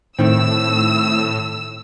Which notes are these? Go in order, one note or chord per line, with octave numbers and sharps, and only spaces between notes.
A2 D#3 C4 E6